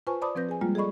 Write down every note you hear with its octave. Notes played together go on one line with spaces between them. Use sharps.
F4 B4 C5 G#5 A5 C#6
C5 D5 A5 B5 D6 D#6
F3 C4 B4 G6 A#6
G#4 G#5
G3 G#3 A#3 F4
G#4 A4 D5 D#5 B5 C#6